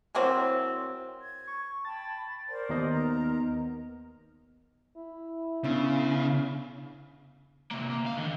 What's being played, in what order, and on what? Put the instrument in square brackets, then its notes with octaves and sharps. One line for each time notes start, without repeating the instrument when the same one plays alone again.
[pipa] E3 F#3 A#3 C4
[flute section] G#6
[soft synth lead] C#6
[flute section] G5 A5 B5 [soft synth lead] A6
[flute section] A#4 C5 D5
[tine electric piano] D#2 D#4 D#5 [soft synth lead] B3
[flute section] A#4 A#5
[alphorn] E4
[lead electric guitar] C#3 [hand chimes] B3 D4
[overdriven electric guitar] C3 A#3
A#3
C#2 F5
D3 D#3